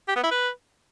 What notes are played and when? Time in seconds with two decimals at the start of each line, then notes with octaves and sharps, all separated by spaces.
0.08 G4
0.16 B3
0.23 E4
0.31 B4